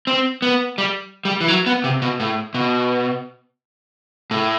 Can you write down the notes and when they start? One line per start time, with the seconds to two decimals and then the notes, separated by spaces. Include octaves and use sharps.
0.07 C4
0.42 B3
0.78 G3
1.25 G3
1.41 E3
1.48 F#3
1.66 B3
1.84 C3
2.02 B2
2.20 A2
2.54 B2
4.31 A2